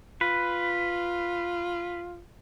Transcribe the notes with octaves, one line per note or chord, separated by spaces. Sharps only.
F4 B4